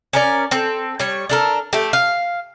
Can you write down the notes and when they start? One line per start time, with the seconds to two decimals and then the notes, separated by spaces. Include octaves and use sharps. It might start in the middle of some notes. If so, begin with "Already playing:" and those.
0.13 C#4 A#4 D5
0.51 C4 A4
1.00 G3 C#5
1.30 D4 A4 A#4
1.73 A3 G4
1.93 F5